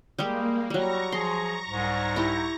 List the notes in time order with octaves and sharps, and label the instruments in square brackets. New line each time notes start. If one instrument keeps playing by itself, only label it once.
[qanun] G3 G#3 G4 [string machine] A#3
[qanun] F#3 G3 [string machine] A#5 C#6 A#6
[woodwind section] F3 G#4 [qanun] C6
[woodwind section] C2 G#2
[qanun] E4 G4